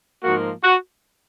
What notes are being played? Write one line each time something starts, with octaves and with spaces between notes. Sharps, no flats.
G#2 F3 A#3 F#4
F#4